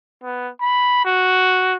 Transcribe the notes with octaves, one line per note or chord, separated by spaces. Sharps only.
B3
B5
F#4